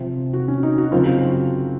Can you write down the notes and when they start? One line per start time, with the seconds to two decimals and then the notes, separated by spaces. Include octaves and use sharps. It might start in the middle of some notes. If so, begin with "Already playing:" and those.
Already playing: C3 F3 C4
0.33 F#4
0.48 C#4
0.63 D#4
0.78 F#4
0.92 F#2 C#3 F3 C4 F4
1.05 F#4